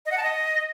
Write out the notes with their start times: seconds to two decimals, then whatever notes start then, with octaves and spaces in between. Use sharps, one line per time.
0.06 D#5
0.12 F#5
0.17 A5
0.23 D#5